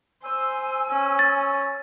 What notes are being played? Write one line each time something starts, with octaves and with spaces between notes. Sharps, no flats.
C5 G#5 E6
C#4
A6